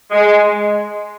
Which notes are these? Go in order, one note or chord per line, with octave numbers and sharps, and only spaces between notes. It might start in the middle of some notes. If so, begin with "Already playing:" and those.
G#3